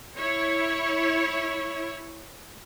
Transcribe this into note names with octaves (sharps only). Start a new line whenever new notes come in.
E4 C#5